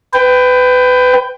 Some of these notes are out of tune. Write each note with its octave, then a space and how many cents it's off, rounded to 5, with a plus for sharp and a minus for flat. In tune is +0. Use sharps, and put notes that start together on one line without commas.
B4 +25 G5 +5